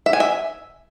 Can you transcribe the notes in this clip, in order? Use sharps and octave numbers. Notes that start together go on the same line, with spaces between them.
E5
G#5
E5